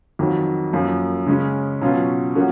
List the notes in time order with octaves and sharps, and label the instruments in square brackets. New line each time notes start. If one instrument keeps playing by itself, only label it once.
[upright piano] F2 D#3 F#3
F#2 F3 A#3
C#3 G#3 C#4
B2 F#3 C#4 F4 B4
F3 A#3 C#4 F#4